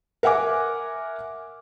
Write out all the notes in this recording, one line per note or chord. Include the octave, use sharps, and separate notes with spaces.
A#4 E5 F#5 G#5 D6